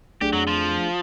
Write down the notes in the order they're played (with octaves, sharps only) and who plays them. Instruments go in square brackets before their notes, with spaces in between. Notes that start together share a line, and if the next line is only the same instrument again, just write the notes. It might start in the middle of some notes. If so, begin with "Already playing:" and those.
[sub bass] B1 [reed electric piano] A3 D4 G#4 [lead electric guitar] G4
[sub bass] F2 [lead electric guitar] F#3
[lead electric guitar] F3